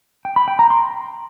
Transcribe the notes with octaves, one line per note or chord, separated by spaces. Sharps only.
G5
B5
G5
A#5
C6